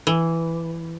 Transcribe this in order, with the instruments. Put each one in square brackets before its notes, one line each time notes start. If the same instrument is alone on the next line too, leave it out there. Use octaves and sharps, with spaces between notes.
[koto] E3